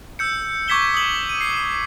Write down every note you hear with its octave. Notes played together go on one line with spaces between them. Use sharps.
E6 G6 C#7
C#6 D6 G#6 B6 E7 G7
D#6 F#7
D#7
C7